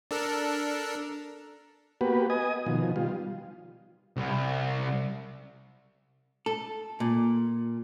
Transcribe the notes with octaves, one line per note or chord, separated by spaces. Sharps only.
D4 A4 A#4
A#3 B3 F#4 G4 B4
D#5 G#5 D#6
B2 D#3 F3
G3 F4
C2
A4
A#2